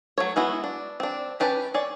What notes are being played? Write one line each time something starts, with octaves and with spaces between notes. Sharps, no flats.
F#3 A3 C#5
G#3 B3 E4 F#4
D4
C4 D4
C#4 G4 B4 A5 B5
G#4 C#5 D5